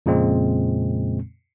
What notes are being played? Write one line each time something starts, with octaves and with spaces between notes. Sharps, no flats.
F2 A#2 C#3 G#3 C4